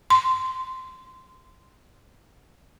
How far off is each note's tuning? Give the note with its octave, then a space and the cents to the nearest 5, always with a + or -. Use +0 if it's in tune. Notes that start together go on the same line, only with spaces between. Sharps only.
C6 -15